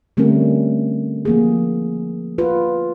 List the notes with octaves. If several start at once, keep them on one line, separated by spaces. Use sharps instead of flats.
D3 G3 A3 C4 C#4 A#4
F3 A#3 G#4
F4 B4